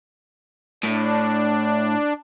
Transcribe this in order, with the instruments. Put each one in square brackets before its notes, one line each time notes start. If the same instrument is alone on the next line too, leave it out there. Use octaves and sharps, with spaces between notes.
[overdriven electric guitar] A2 [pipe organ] D4